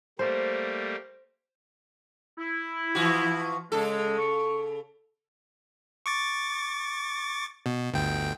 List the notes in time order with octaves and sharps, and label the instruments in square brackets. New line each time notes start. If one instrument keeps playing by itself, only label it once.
[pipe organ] G3 A3 A#3 [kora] C5
[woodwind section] E4
[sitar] E3 F3 F#4
[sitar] C#3 A4 [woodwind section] G#3
[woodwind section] C#6
[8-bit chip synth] C#6 D6 A6
B2
G1 D2 G5